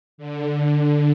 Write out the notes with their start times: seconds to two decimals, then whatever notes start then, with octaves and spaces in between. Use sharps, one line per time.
0.18 D3
0.73 D3